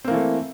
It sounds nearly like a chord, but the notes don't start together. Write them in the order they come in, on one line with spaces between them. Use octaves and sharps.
C4 A#3 E3 A3